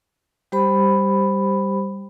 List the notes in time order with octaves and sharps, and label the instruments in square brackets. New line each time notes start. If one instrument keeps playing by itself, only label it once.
[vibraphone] G3 G4 C5 B5